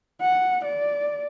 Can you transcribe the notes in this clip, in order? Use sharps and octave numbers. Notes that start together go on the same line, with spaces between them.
F#5
D5